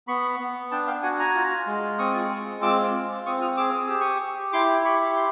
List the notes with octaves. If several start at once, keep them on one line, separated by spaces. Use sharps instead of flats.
B3 B5 C#6
B3
D4 G5 A5
F5 G5
F#4 F#5 G#5
G#5 A#5
F4
G#3
C4 C#6 D#6
G#3
F4 D6 E6
F4
C4 C#6 D#6
D#6 F6
G#4 D6 E6
D#6
G4 E6
C#6 D#6
G4
E4 C6 D6
G4 B5 C#6
C6